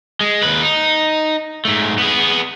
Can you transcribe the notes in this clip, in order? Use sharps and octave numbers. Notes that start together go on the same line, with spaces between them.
G#3
D#2 B4
D#4
G#2 A3
B3 G#4